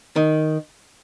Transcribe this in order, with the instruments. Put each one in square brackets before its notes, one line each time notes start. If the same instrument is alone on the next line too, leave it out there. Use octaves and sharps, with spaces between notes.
[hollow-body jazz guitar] D#3